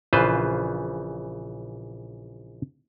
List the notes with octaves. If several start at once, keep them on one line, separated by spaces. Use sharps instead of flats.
A#1 C#3 E3 F4 B4 C5